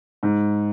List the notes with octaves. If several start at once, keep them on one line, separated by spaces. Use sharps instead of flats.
G#2